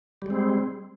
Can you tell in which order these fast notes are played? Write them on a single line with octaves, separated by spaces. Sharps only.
G3 G#3 C4